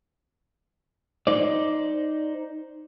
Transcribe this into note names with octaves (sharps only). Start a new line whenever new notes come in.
D#4 C5 D5